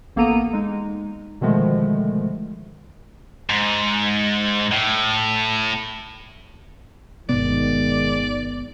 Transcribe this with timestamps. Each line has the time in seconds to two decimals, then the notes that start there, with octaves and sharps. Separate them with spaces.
0.16 A1 A#3 B3 A4 A#5 D#7
0.53 G#3 D#4
1.41 B2 D3 D#3 F3 G#3 A3
3.50 G#2
4.71 A2
7.29 G1 B2 D#3 G#3 B3 D5